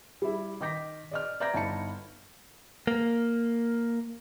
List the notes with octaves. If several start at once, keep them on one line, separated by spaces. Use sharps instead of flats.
G3 E4
D#3 D#5 D6 G6 A#6 B6
D5 D#5 F6
D5 E5 A#5 G6 G#6 A#6
G1 D#4 E4 A5 C#7
A#3